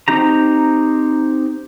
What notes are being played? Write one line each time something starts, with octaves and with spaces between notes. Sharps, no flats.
C4 D#4 G4 A#5